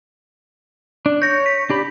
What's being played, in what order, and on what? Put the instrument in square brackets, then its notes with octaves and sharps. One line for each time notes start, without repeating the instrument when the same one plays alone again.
[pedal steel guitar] D4
[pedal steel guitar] C#5 [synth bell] G6 A#6
[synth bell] B6
[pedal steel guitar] D4 G4 B5